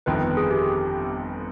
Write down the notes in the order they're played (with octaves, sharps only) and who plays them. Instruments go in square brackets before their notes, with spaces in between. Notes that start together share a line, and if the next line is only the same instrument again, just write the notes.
[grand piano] G1 F2 D#3 B3 [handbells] B4
[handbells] B4
G#4
G4